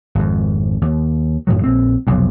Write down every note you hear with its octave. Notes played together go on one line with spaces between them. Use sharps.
G#1 F2
D#2
F#2 A2 D#3 F#3
A#1 C4
F1 B1 F2